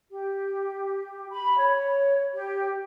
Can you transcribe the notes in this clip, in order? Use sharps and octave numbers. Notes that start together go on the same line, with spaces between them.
G4
B5
C#5
G4